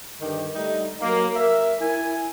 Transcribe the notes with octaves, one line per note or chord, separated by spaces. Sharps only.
G2 D3 D#3 G4
G3 A3 D#4
F#3 A#3
A#4 E5
E4 G#5